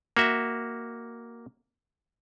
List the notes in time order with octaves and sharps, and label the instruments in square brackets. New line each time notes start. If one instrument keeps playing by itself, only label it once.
[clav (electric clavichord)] A#3 F#4 E5